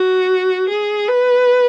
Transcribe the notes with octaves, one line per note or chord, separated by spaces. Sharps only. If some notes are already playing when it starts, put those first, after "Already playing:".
Already playing: F#4
G#4
B4